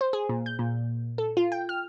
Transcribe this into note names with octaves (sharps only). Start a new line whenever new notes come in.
C5
G#4
A#2
G6
A#2
A4
F4
G5
F6